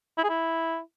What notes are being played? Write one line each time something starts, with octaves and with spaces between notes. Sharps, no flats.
E4
G#4
E4